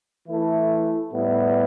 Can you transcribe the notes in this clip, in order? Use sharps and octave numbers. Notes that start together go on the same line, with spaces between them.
E3 A3 E4 A4
A2 G3 B3 E4